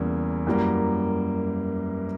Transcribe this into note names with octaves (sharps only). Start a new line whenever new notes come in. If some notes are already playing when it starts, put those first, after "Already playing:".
Already playing: E2 C#3 G3 A#3
F#2 E3 G3 A#3